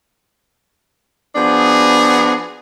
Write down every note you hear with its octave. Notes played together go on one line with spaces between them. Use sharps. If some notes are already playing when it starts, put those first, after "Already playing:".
F3 B3 D4 F#4 G#4